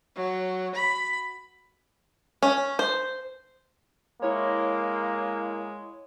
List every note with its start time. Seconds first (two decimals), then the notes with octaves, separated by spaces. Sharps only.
0.16 F#3
0.76 B5
2.43 C#4
2.79 C5
4.22 G#3 A#3 E4 C#5